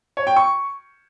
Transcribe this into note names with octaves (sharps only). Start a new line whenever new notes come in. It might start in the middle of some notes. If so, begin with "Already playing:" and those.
C#5
G5
C#6